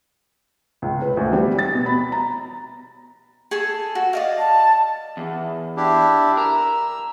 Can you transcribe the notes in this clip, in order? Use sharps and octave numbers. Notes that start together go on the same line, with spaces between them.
C#2
B4
D2
G3
A6
B2
B5
A#5
G#4 A4 A5
F#4
D5 D#5 F5
A5
E2
D4 E4 G4
A#4 E6